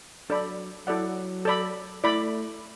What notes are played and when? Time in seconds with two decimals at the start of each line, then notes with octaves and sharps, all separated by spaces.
0.29 F#3 D4 A4 D5 B5
0.87 F#3 E4 A4 D5 F#5
1.45 A4 D5 B5
2.04 A3 E4 D5 B5